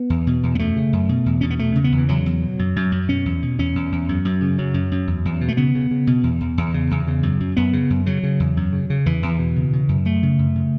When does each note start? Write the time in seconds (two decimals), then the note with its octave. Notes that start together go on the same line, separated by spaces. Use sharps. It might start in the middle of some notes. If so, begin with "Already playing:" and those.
Already playing: B3
0.10 E2
0.27 B2
0.43 E2
0.55 B3
0.59 F#2 A3
0.76 C#3
0.93 F#2
1.09 B2
1.26 E2
1.41 B2 C#4
1.50 B3
1.59 E2 A3
1.75 C#3
1.84 B3
1.92 E2
1.97 E3
2.09 E2 F#3
2.26 E2
2.42 B2
2.59 F#2
2.76 F#2
2.92 F#2
3.09 B2 C#4
3.25 E2
3.42 B2
3.59 E2 C#4
3.75 E2
3.92 E2
4.09 F#2
4.25 F#2
4.42 C#3
4.58 F#2 F#3
4.74 F#2
4.92 F#2
5.07 E2
5.25 E2
5.41 B2
5.48 A3
5.57 C#3 B3
5.75 C#3
5.91 C#3
6.07 B2
6.23 E2
6.41 E2
6.57 E2
6.74 C#3
6.91 E2
7.07 C#3
7.23 F#2
7.40 F#2
7.57 F#2 B3
7.73 C#3
7.90 F#2
8.06 C#3 F#3
8.23 C#3
8.40 E2
8.57 F#2
8.73 C#3
8.90 C#3
9.06 E2 E3
9.23 E2
9.39 B2
9.56 C#3
9.73 C#3
9.89 F#2
10.05 F#2 A3
10.23 C#3
10.39 F#2
10.55 C#3